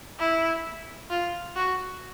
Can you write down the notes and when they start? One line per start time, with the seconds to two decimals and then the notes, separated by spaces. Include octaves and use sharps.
0.19 E4
1.10 F4
1.56 F#4